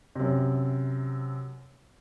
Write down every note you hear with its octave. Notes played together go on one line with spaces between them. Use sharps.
F#2 C3